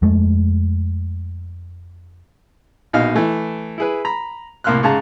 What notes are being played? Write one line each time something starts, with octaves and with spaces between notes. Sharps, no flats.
F2 G#3 A3
A#1 B2 D#4 F5 F6
E3 A3
E4 G#4 B4
A#5 B5
C2 A2 A#3 C6 F6 F#6
G#2 C#3 A5 A#5